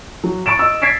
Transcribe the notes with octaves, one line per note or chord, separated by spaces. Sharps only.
F#3
C#6 A6 D7 E7
D#5 E6
G#6 A6 B6 C7 D7 E7